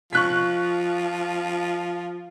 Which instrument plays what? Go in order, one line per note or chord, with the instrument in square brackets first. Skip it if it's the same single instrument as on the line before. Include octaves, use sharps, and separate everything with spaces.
[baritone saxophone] F3 [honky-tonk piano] C#6 F#6 B6